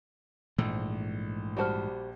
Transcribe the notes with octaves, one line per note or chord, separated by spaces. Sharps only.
A#1 G#2 E3 A3 E6
G3 F#4 G4 C5 A5 F6